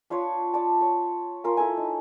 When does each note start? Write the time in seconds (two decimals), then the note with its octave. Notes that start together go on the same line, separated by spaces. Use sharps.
0.10 D4 F4 B4 C#5
0.53 D5 A5
0.81 C#5
1.44 F4 A#4 G#5
1.57 E4 A4 G#5
1.77 D#4